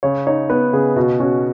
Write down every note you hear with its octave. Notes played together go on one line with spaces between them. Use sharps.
C#3 C#5
D#4 C#5
B3 B4
C#3 G#4
B2 F#4
C#4 F#4